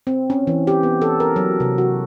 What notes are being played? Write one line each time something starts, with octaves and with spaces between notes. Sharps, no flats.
C4
C#4
E3
G4
B3
A4
A#4
F#3
C3
F#4